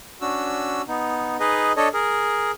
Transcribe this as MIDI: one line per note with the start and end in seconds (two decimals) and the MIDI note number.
0.21 0.82 61
0.21 0.82 62
0.21 0.82 66
0.21 0.82 88
0.88 1.37 59
0.88 1.37 63
1.40 1.72 63
1.40 1.72 68
1.40 1.72 71
1.40 1.72 75
1.77 1.88 62
1.77 1.88 69
1.77 1.88 73
1.77 1.88 75
1.94 2.51 68
1.94 2.51 70